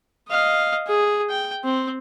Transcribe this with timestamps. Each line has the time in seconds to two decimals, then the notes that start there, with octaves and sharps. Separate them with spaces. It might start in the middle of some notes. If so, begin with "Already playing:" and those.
0.28 D#5 F5
0.88 G#4
1.29 G5
1.64 C4